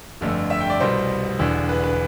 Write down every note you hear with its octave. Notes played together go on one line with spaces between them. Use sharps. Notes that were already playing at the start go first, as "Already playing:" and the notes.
G1 F2 D3 A3
E5
G5
D5
C2 B2 G3 C5
E1 E2 D3
B4
B4